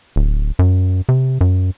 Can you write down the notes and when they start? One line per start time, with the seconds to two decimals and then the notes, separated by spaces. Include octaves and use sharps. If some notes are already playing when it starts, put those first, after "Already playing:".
0.16 D1
0.59 F#2
1.09 C3
1.41 F#2